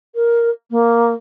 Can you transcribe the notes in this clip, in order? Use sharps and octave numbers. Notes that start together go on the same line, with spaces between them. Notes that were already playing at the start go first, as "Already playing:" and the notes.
A#4
A#3